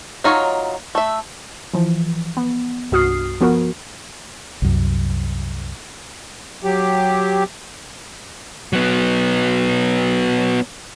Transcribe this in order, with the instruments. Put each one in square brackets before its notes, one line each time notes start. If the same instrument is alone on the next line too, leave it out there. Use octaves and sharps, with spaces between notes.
[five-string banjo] F#3 D#4 F4 C#5
A3 E5
[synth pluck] E3 F3
B3
C2 G2 F#4 D#6 F6 C7
F3 B3 F#4 A#4
[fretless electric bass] C2 F#2
[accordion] F#3 G4
[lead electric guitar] F#3 B3